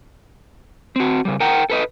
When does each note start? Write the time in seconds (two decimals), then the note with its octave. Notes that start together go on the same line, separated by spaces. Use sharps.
0.96 C4 F#4
1.25 C#3 G3
1.40 A#4 F#5 G5 A#5
1.70 A4 B4 D#5